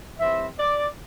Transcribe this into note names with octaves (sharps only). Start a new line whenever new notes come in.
E3 G3 C4 E5
D5